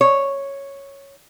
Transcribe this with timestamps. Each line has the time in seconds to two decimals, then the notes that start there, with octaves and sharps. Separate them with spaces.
0.01 C#5